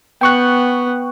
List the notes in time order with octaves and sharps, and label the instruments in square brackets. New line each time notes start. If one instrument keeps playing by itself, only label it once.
[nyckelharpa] B3 [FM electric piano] G5 C#6 F#6